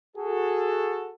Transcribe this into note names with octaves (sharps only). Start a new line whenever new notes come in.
F#4 G#4 A4